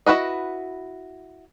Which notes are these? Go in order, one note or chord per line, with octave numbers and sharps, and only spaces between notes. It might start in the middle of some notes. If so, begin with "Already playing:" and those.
E4 F#4 B4 D#5